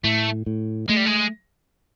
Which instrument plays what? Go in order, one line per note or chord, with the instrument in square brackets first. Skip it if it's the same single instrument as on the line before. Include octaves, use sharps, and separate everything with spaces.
[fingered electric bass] A2 [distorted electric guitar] A3
[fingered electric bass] A2
[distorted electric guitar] G#3 [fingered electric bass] A3
[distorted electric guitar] G3
G#3